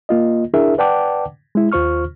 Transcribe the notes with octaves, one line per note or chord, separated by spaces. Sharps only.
A#3 F4 D#5
D4 E4 G#4 A#4 E5
B4 D5 F#5 G5 A5 D6
G#3 E4
D#2 F4 C5 C#6 F6